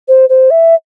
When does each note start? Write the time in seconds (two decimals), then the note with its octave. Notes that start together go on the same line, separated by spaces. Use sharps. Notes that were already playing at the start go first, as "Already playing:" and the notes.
0.08 C5
0.29 C5
0.51 E5